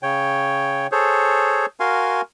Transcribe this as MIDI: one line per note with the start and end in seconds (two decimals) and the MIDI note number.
0.03 0.87 49
0.03 0.87 73
0.03 0.87 79
0.92 1.66 68
0.92 1.66 69
0.92 1.66 72
0.92 1.66 73
1.80 2.21 66
1.80 2.21 70
1.80 2.21 77
1.80 2.21 80
1.80 2.21 84